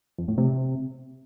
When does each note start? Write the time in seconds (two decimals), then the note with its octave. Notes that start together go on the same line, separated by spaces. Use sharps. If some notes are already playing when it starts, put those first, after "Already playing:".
0.18 F2
0.28 A2
0.38 C3